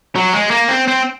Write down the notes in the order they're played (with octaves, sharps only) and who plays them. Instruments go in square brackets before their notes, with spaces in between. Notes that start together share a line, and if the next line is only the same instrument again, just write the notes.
[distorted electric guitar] F#3
G#3
A#3
C4
C4